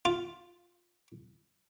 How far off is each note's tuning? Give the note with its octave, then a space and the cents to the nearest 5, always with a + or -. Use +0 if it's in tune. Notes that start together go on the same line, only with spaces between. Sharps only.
F4 +5